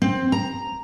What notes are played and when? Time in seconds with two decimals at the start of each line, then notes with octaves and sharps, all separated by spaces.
0.02 C4
0.32 A#5